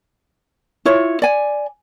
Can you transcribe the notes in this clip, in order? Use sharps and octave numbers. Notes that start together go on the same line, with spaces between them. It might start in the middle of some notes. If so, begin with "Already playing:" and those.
E4 F4 C#5
D5 G#5